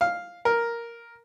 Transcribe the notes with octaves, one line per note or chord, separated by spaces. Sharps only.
F5
A#4